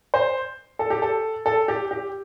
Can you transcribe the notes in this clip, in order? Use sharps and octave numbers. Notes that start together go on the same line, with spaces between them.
C5
A4
G4
A4
A4
G4
G4